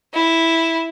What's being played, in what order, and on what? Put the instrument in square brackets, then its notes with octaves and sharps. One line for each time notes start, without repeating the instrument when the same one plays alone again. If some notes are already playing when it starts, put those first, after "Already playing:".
[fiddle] E4